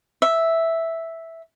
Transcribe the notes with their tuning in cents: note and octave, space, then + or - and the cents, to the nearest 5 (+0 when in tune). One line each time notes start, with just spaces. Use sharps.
E5 -5